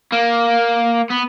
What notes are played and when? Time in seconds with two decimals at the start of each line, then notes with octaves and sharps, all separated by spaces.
0.12 A#3
1.11 B3